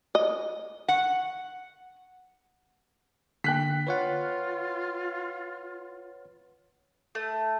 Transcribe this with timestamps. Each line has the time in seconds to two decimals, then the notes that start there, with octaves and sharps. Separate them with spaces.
0.15 D#5
0.88 F#5
3.44 D3 A#3 G5 F#6 B6
3.87 F4 B4 C#5 F#5
7.15 A3